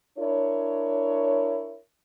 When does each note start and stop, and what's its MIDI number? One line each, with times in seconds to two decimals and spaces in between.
0.18 1.78 62
0.18 1.78 64
0.18 1.78 70
0.18 1.78 73